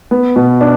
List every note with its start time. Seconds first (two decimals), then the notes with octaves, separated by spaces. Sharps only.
0.11 B3
0.36 B2
0.61 D4